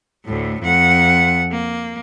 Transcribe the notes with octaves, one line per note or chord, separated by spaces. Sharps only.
D2 A2
F2 F#5
A#3